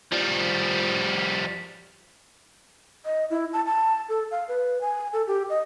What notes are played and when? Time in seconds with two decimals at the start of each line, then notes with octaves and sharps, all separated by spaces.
0.12 F3 G3
3.05 D#5
3.30 E4
3.53 A5
3.67 A5
4.09 A4
4.31 F5
4.48 B4
4.81 G#5
5.13 A4
5.27 G4
5.49 D#5